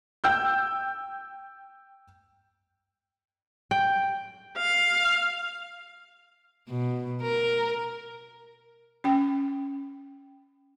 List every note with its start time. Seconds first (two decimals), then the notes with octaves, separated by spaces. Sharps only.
0.24 G5 E6 G6
3.71 G5
4.57 F5
6.69 B2
7.22 A#4
9.04 C#4 G5